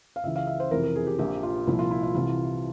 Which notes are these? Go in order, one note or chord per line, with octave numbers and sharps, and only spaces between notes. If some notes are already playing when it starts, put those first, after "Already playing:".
F5
C#2 C#3 E3 E5
F5
E5
C5
F2 C3 E3 A#4
A#4
G#4
G4
A#1 A#2 F3 A#3 G4
F4
C2 A#2 F3 E4
F4
E4
F4
C2 C3 E3 F4